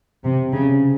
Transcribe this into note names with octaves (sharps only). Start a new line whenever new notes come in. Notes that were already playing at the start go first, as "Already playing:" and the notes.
C3
C#3